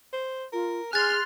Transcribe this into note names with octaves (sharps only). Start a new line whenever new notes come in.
C5
F4 A#4
G#4 G#5 C6 F6 F#6 A6